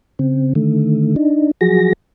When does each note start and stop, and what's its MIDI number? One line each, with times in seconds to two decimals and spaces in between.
0.19 0.53 49
0.19 0.53 60
0.55 1.15 50
0.55 1.15 51
0.55 1.15 57
1.16 1.51 62
1.16 1.51 63
1.61 1.93 53
1.61 1.93 54
1.61 1.93 66
1.61 1.93 68
1.61 1.93 94